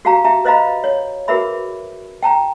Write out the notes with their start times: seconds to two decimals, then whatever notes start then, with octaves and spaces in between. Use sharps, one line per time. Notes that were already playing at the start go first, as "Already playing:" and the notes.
0.05 F#4 G4 F5 A5 A#5
0.25 G4 E5 A5 A#5
0.45 B4 C5 D#5 F5 A#5 B5
0.84 C#5
1.28 F#4 G#4 A#4 B4 E5 B5
2.23 G5 A5 A#5